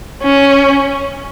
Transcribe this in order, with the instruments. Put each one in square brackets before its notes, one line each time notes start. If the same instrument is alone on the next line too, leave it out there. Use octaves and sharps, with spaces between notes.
[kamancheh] C#4